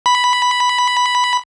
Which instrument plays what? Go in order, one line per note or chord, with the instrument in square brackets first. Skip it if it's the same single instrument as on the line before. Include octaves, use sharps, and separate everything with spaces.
[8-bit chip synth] B5